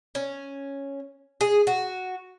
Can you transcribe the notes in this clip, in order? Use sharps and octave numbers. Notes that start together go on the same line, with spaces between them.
C#4
G#4
F#4